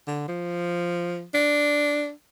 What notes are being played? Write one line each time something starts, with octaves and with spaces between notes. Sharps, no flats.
D3
F3
D4